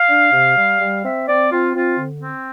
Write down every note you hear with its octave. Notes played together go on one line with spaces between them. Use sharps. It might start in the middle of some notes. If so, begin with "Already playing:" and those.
Already playing: F5
D4
C3
G3
G3
C4 E5
C4 D5
C4 F4
C4 F4
D3
C4